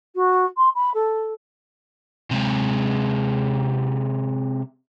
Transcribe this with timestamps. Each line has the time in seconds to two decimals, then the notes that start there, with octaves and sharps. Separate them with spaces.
0.15 F#4
0.57 C6
0.75 B5
0.94 A4
2.31 C3 G#3